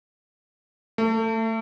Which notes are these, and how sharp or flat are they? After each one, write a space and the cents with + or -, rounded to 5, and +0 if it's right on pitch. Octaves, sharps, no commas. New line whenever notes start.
A3 +25